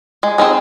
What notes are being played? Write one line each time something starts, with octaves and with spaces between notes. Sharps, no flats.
G#3
C4 D#4 G#4